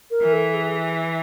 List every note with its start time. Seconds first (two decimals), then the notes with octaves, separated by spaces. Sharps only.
0.11 A#4
0.22 E3
0.33 A4
0.54 G#4